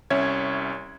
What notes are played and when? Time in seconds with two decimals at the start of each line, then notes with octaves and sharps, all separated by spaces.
0.10 C2 C#4 C#5 E5 G#6